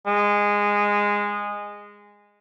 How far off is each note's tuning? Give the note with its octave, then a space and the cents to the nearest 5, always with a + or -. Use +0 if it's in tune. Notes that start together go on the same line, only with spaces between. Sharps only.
G#3 -15